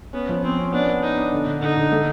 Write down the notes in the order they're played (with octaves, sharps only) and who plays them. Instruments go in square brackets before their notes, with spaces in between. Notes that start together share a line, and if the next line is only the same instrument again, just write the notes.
[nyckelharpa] B3 [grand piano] C#4
[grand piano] F3
[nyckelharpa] C4 [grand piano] C#4
[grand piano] C#4
[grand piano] B3 [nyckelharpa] D4
[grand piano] B3
[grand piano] D4 [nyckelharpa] D#4
[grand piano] D4
D3
D3
[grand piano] D3 [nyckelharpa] D#4
[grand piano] D3
A3